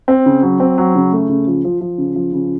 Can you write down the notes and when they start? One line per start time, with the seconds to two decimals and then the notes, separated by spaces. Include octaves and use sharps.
0.08 C4
0.26 C#3
0.42 F#3
0.60 C4
0.78 F#3
0.95 C#3
1.12 A3
1.29 C#3
1.47 F3
1.64 F3
1.81 F3
1.98 C#3
2.15 F3
2.33 C#3